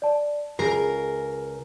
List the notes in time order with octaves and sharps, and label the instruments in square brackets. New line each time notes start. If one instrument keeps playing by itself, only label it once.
[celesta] D5 A5
[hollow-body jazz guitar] C#2 A#5 [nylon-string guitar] F4 G#4 [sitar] A#4 [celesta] C7